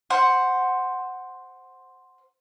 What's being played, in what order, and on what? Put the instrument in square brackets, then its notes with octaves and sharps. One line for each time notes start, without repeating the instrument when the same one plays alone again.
[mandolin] C5 F#5